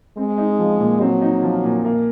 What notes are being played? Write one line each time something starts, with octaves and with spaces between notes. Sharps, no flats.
G#3 C4
D#4
F3
A#2
F#3 C4
D#4
F3
A#2
A#3